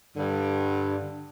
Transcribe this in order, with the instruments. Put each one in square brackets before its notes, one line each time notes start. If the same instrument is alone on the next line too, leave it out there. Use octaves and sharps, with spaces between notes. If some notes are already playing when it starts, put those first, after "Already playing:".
[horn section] G2 D3